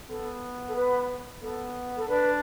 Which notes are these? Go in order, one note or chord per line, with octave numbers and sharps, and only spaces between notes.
B3 A4
A4
B4
B3 A4
A4
D4 B4